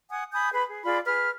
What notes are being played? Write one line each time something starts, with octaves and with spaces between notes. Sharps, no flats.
F#5 G#5 D#6
G#5 B5 D#6 G6
G#4 B4 B5
G#4
F4 G#4 D5 B5
G#4 B4 F6